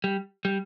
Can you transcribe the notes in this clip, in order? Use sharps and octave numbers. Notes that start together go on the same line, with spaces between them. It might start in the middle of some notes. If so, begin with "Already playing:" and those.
G3
G3